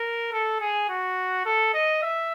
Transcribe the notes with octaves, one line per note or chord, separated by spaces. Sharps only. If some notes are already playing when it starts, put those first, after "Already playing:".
Already playing: A#4
A4
G#4
F#4
A4
D#5
E5